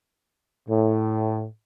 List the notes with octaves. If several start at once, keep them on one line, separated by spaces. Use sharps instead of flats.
A2